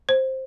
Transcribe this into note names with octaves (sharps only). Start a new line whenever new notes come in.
C5